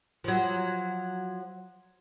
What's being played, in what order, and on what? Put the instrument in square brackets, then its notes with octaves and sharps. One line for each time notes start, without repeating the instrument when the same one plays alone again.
[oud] F3 F#3